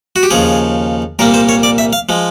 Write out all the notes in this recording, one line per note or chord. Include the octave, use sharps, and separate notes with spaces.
F#4
G4
D#2 C#3 F3 G#4
C2 A#2 G3 A#3 A#4
C5
C#5
D5
E5
F5
F3 G#3